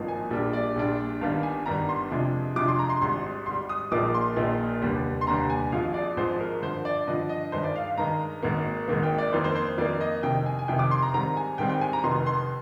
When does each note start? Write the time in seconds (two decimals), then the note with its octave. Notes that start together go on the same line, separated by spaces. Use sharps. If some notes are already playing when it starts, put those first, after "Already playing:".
Already playing: G#1 G2 F3 A#3 D#4
0.08 G#5
0.31 A#1 A#2 G3 D4
0.53 D5
0.76 A#1 A#2 G3 D4
1.21 G1 G2 D#3 G3 D4 F5
1.43 G#5
1.66 G1 G2 D#3 G3 D4 A#5
1.89 C6
2.10 F2 C3 F3 G#3 D4
2.56 F2 C3 F3 G#3 D4 D6
2.68 C6
2.79 A#5
2.89 C6
3.01 G#1 G#2 G3 C6
3.46 G#1 G#2 G3 C6
3.69 D#6
3.91 A#1 A#2 F3 A#3 D#4 D6
4.14 C6
4.36 A#1 A#2 F3 A#3 D#4
4.82 F1 D#2 D3 G3 D4
5.21 C6
5.27 F1 D#2 D3 G3 D4 A#5
5.50 G#5
5.72 G#1 G#2 F3 G#3 F5
5.94 D5
6.17 G#1 G#2 F3 G#3 C5
6.40 A#4
6.62 G2 D3 F3 C5
6.85 D5
7.07 G2 D3 F3 D#5
7.29 D#5
7.52 G2 D#3 G#3 C5
7.64 D5
7.76 F5
7.87 F5
7.98 G2 D#3 G#3 A#5
8.43 G#1 G#2 D#3 A#3
8.88 G#1 G#2 D#3 A#3
9.03 G5
9.18 D5
9.33 F2 D#3 A#3 C5
9.44 C5
9.56 C5
9.78 F2 D#3 A#3 D5
10.01 D#5
10.23 F2 C3 D#3 G5
10.46 G#5
10.59 G#5
10.68 F2 C3 D#3 G5
10.79 D6
10.91 C6
11.02 A#5
11.13 G#2 D#3 G3 C4 A#5
11.37 G#5
11.58 G#2 D#3 G3 C4 G5
11.69 G5
11.81 G#5
11.93 A#5
12.04 F1 F2 D#3 C6
12.26 C6